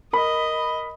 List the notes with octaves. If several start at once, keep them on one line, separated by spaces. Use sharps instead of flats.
A#4 D#5 B5